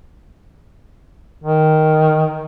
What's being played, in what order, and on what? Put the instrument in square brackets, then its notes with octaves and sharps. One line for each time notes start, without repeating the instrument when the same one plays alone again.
[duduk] D#3